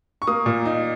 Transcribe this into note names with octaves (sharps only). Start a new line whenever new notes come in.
C#6
A#3 D#6
A#2
D#4